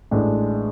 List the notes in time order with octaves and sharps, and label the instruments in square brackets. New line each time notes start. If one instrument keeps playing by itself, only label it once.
[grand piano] A1 A2 G#3 D4